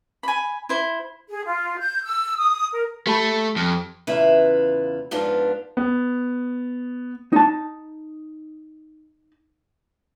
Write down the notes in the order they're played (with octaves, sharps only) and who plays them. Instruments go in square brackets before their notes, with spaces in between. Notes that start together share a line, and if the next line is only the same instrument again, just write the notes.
[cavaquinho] G#5 B5
E4 C5
[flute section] G#4
F4
G6
E6
D#6
A#4
[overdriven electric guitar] A3 [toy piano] G4 A5 B5
[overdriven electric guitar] F2
[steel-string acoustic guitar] E2 C#3 E4 F4 B4 E5
G#2 F3 B3 D4 F4
[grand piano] B3
[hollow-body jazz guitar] D#4 A5